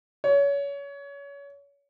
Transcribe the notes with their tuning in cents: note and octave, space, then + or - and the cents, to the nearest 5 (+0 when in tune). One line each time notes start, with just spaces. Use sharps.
C#5 +30